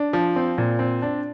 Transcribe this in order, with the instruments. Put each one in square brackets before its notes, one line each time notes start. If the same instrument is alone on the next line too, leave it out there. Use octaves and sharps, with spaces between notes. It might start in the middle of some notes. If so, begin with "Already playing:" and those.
Already playing: [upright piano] D4
F3
C4
A#2
C4
D4